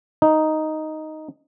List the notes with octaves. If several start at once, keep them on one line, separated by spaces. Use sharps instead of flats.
D#4